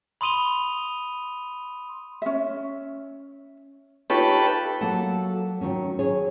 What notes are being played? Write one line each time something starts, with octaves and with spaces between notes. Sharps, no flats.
B5 C6 D#6 D#7 F7 G7
C#4 E5
D#4 F4 G4 A4 B4 C#5
F#3 A#3 A4 F#5 A5
D#3 E3 F#3 C#4
G#4 C#5